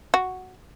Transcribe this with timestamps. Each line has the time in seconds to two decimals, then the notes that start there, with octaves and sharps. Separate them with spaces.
0.14 F#4